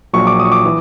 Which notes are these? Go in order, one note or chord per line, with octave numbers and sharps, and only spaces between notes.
A#1 A#2 F#3 C#6
D6
D#6
C#6
D6
E3